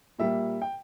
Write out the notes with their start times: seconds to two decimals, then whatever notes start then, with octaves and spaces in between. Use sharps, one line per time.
0.19 A#2 G3 A#3 E5
0.62 G5